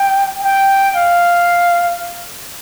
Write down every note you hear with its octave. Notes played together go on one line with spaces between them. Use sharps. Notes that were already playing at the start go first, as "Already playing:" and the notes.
Already playing: G5
G5
F5